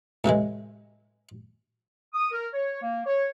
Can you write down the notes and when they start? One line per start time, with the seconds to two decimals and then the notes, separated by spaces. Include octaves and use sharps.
0.24 A2 C3 E3 G#3
2.14 D#6
2.32 A#4
2.54 C#5
2.82 A#3
3.06 C#5